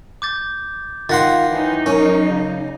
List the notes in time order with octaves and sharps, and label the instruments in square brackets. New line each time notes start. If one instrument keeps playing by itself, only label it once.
[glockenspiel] D6 G6 A6
[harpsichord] D#3 F#5 C6 [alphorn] F4 [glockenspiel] A6 A#6
[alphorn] E3 [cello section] F#3 D#4
[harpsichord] C#4 [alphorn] A#4
[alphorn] C#3